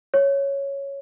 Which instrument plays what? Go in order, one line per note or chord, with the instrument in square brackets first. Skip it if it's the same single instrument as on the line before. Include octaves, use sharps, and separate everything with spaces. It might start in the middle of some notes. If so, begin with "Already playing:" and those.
[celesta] C#5